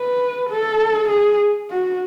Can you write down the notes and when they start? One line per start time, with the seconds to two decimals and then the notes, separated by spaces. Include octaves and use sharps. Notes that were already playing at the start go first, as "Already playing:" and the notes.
Already playing: B4
0.50 A4
1.10 G#4
1.71 F#4